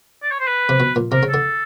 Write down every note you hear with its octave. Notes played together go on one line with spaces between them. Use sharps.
D5
C#5
C5
B4
C3
B2
A#2
C3 A#4
C#3
A4
D3